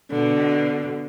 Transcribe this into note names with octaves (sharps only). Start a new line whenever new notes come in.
B2 D3